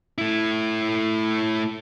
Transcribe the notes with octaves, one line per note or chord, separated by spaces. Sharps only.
A3 E4